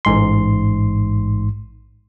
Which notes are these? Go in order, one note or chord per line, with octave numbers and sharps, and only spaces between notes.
A1 G#2 C6